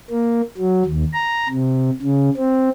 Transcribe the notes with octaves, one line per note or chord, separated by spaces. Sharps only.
A#3
F#3
D#2
A#5
C3
C#3
C4